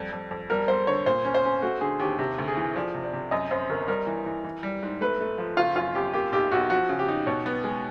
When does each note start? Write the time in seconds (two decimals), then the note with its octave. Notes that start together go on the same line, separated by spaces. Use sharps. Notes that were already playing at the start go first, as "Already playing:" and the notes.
Already playing: F2 G3
0.12 F2
0.31 F2
0.50 G3 A#4
0.68 G3 C5
0.87 D3 C#5
1.06 A#2 C5
1.25 C#4
1.34 C5
1.44 C#4
1.62 A3 F#4
1.81 D3 G#4
2.00 D#2 G4
2.18 C3 G4
2.38 D2
2.48 G#4
2.57 E3
2.76 F3 D5
2.94 C3
3.04 D5
3.13 C3
3.31 F#2 D#5
3.51 F#2 C5
3.70 G1 A#4
3.88 G3 A#4
4.07 E3
4.26 E3
4.44 E3
4.63 G3
4.83 G#2
5.01 A3 B4
5.21 A3
5.38 F3
5.57 F#1 F4
5.76 F#2 F4
5.95 F#2 G4
6.13 A#3 G4
6.32 B1 G4
6.52 B1 F#4
6.70 F3 F#4
6.89 C#3
6.99 G4
7.08 D#4
7.27 B2 C#5
7.46 B3
7.64 G#3